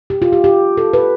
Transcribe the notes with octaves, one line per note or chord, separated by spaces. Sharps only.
G4
F4
G4
G4
A4
B4